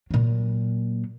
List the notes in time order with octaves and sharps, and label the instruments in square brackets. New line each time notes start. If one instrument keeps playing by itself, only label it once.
[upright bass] A#2 F#3